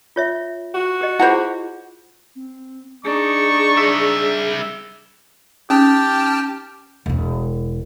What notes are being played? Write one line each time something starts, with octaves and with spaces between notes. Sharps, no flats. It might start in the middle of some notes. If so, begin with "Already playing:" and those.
F4 C#5 E5
F#4
G4 D#5
E4 F4 G#4 C5 C#5 F#5
C4
D4 D#4 G#4 C#6
G3 E5
C#4 D#4 G4 G5 A5 D#6 F6
E1 E4